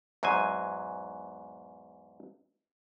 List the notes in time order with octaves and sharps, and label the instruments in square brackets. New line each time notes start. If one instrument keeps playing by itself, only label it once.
[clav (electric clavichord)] E2 G#2 F#3 C5 G#5